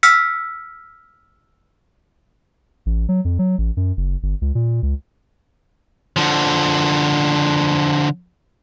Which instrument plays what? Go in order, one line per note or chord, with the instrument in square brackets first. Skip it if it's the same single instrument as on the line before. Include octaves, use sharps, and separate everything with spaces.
[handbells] E6 F6 B6 C#7
[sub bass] A1
F#3
F2
F#3
A1
F#2
F#1
G1
C#2
A#2
C#2
[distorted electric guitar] D3 F3